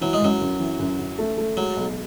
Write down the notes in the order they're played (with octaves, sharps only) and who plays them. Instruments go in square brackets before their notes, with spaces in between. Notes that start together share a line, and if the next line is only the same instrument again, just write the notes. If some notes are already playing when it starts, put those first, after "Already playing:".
[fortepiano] E3 [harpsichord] F#3
[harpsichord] G#3
[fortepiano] F#2 [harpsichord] F#3
[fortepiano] F#2
E3
F#2
F#2
A3
A3
[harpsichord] F#3 [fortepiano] G#3
[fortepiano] B1